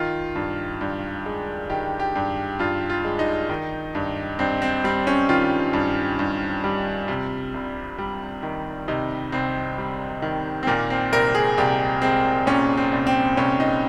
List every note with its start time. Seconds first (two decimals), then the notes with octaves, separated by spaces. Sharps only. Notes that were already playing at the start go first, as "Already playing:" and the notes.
Already playing: D#3 F4
0.36 G2
0.81 G2
1.26 G#3
1.70 D#3 G4
2.00 G4
2.16 G2
2.59 G2 F4
2.90 F4
3.05 G#3
3.19 D#4
3.50 D#3
3.95 G2
4.39 G2 C4
4.62 C4
4.84 G3 C4
5.07 C#4
5.29 D#3 F4
5.73 G2
6.19 G2
6.64 G3
7.08 C3
7.54 C2
7.98 G3
8.43 D#3
8.88 C3 D#4
9.32 C2 C4
9.78 G3
10.22 D#3
10.63 C4
10.67 A#2 A#3
10.90 C4
11.13 C2 A#4
11.35 G#4
11.58 C2 G4
12.02 G#3 C4
12.47 A#2 C#4
12.77 C4
12.92 C2
13.07 C4
13.37 C2 C#4
13.60 D#4